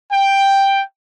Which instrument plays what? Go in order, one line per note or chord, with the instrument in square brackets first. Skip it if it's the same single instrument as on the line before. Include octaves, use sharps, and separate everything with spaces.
[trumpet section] G5